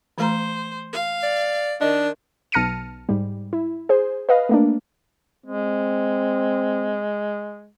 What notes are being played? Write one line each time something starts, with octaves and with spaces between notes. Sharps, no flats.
E3 A3 C5 A#5
F5
D5
D#3 D4 D#5
B1 A5 F6 A#6 C#7 D#7
G#2 G3
E4
G#4 C5
B4 D#5 F5
A3 A#3 D4
G#3 C4